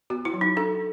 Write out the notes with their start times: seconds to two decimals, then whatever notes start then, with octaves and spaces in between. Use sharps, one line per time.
0.10 B3 F#4
0.25 E4
0.34 F#3
0.41 D#4
0.57 D4 A4